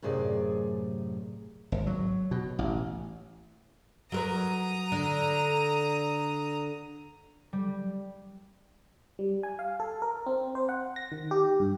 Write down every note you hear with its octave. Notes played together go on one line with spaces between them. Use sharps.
F#2 A2 C3 G#4 D5
G#1
F#3
B2
A1
F#3 A#4 B4 A#5 D#6
D3
G3
G3
G#5
F5
A4
A#4
C4
C5
F#5
A#6
D#3
G4
G2